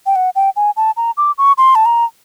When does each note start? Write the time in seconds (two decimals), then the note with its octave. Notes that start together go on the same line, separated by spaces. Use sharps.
0.06 G5
0.16 F#5
0.36 G5
0.56 G#5
0.77 A5
0.97 A#5
1.17 D6
1.38 C#6
1.58 C6
1.75 A5
1.86 A#5